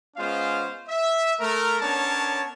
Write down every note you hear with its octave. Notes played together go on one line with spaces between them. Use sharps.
G#3 B3 C#4 F4 C5 F5
E5
A3 A#4
B3 C#4 D4 A#4 C#5 A5